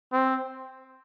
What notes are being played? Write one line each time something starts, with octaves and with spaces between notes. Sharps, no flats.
C4